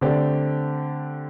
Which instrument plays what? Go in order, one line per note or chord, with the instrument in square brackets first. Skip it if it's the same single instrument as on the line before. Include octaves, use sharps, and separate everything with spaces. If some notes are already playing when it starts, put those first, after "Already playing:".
[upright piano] D3 A3 C4 G4 D5